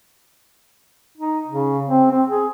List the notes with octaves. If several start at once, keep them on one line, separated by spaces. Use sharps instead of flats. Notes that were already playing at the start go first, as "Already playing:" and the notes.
D#4
C#3
C4
C4
G#4